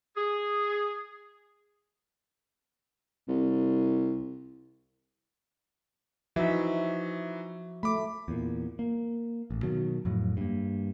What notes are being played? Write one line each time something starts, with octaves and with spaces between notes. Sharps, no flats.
G#4
C2
E3 F3 D#4 F#4 E5
A3 B5 D6
E2 A#2
A#3
A1
B2 D#3 F#3
F2 A2 F#3
G2 A#3